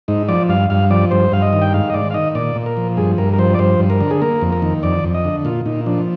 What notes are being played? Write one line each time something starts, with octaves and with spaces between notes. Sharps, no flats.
G#2 D#4
F3 D5
G2 F5
G2 F5
F3 D5
G2 C5
G2 F5
D#5
D#3
G5
G#2 F5
D#5
G#2 D5
F5
D#3 D#5
A#2 D5
A#2
A#4
F3
G2 G#4
G2 A#4
A#4
F3 C5
D5
G2 C5
G2
A#4
D3
G#4
A#3 A#4
F2
A#4
D#3
F2 D5
F2
D#5
D3
A#2 F4
A#2 D#4
F3 D4